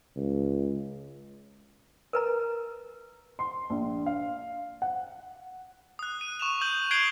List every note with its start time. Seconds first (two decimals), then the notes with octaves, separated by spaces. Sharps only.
0.16 C#2
2.13 A#4 B4 A#5
3.39 C6
3.70 A#1
4.06 F5
4.82 F#5
5.99 D#6 F#6
6.21 D#7
6.40 C#6 E7 F7
6.61 D#6 G6 F#7
6.91 F#6 G#6 C7 D7 F7 G7